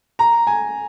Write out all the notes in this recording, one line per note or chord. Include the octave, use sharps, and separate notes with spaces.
A#5
G#5